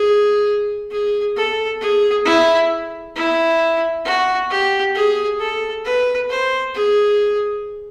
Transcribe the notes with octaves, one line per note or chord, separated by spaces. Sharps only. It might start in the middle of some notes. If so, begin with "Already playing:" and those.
Already playing: G#4
G#4
A4
G#4
E4
E4
F#4
G4
G#4
A4
B4
C5
G#4